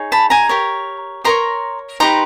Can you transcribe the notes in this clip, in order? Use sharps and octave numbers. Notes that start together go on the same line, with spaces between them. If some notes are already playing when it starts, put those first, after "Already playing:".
Already playing: D#4 G#4 C#5
A5 B5
G#5 A#5
G4 A#4 C#5
G4 A#4 C#5 A#5 C6
D#4 G4 B4 A#5 C6